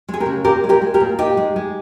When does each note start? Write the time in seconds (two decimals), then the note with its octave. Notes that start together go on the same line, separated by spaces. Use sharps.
0.09 G#3
0.14 G#4
0.20 G4 A#4
0.26 C#3
0.44 A#2 G4 A#4
0.64 G#3
0.69 G4 A#4
0.82 G#3
0.94 G4 A#4
1.00 A#2
1.18 G#3 D#4 G4
1.37 G#3
1.56 G#3